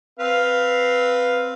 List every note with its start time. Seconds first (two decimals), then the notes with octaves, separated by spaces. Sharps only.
0.19 C4 B4 F5